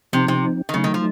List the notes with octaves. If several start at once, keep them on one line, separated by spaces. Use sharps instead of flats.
C3 F3 C4 D#4
C3
D#3
C#3 F#3 A3 D#4
D#3
F3